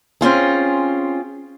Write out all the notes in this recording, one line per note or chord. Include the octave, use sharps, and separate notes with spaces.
C4 C#4 F4 G#4